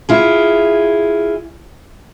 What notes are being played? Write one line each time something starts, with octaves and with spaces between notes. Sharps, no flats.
E4 F4 G#4